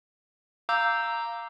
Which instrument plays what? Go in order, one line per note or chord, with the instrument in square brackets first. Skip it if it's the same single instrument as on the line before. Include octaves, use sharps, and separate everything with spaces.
[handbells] F5 A#5 D6 E6 G6